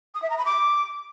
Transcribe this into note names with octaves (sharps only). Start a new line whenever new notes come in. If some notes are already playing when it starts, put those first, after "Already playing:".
D#6
E5
A#5
B5
D6